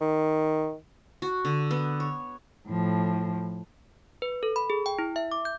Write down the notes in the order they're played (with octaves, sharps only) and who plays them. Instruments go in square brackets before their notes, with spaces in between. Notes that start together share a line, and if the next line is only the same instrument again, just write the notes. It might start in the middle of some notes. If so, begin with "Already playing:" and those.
[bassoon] D#3
[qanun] F#4
D3
B3
C#5
[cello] A2 F3
[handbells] B4
A4
B5
G#4
G5
E4
E5
D6
G6